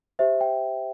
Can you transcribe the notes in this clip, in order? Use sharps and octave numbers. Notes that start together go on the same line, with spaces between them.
G4 C5 E5
G5